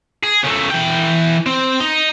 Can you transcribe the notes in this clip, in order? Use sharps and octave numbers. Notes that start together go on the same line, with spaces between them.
G#4
C#3 A3
E3 G5
C4
D#4